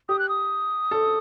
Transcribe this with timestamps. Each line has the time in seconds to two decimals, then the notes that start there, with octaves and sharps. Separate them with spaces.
0.09 G4 D#6
0.19 F#6
0.29 D#6
0.91 A4